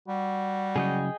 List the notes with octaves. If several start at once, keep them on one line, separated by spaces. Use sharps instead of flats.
G3 F#4
C#3 F#3 G#4 D#5 G5